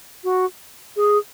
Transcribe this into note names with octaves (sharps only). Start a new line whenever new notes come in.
F#4
G#4